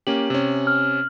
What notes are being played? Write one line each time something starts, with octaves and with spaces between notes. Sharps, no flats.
A#3 C#4 G4 F#7
C3 C#4
F6